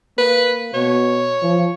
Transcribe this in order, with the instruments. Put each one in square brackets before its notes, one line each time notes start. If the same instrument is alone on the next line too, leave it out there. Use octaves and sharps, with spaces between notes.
[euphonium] A#3 [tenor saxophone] B4
[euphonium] B2 [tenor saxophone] C#5
[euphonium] F3